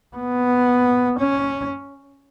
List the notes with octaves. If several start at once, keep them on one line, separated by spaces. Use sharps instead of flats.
B3
C#4